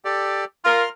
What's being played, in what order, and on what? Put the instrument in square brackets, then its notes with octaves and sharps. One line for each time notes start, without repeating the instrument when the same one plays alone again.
[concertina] G4 A4 D5
[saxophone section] F4 A#4 [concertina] C6 F6